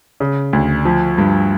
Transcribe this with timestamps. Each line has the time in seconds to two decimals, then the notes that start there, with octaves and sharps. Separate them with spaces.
0.20 C#3
0.53 D2
0.85 F3
1.18 G2